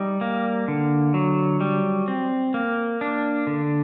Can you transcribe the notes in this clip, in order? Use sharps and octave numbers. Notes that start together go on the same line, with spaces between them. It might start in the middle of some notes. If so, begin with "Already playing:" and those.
Already playing: G3 D#4
A#3
D3
F#3
G3
C4
A#3
D4
D3